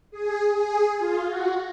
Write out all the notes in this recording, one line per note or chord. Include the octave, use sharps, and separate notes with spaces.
G#4
G#4
F4
F#4